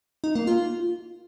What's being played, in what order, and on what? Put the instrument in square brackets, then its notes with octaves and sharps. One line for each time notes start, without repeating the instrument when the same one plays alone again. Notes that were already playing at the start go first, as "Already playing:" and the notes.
[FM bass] D#4
A#3
F4